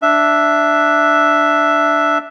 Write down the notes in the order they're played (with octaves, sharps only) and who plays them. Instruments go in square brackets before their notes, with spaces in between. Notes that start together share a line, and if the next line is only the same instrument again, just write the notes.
[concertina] D4 E5